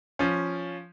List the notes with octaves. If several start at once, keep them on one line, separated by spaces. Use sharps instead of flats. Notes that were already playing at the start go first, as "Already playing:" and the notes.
F3 C#4